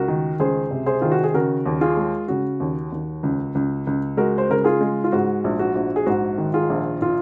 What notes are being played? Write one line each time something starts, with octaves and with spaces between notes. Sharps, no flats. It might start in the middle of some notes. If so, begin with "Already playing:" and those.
Already playing: C#2 F#4 A#4
D#3
C#2 G#4 C5
C3
G#4 C5
D#3 F4
F#4
G#4
C#3 F#4 A#4
D#2
F4 G#4
G#3
C#3 F#4
D#2
D#2
C#2
C#2
C#2
G#3 F#4 A#4
C5
C#3 A#4
F4 G#4
G#3
F4
G#2 F#4
A#1
F#4
A#1
G#4
G#2 F#4
D#3
F4 G#4
A#1
A#2 F4